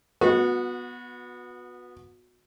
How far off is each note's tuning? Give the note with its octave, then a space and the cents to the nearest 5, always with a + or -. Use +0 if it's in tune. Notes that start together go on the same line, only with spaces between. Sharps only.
B3 -5 F#4 -30